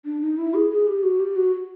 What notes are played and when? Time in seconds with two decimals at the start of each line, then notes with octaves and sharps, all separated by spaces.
0.05 D4
0.21 D#4
0.38 E4
0.54 G#4
0.70 G#4
0.87 G4
1.03 F#4
1.20 G4
1.36 F#4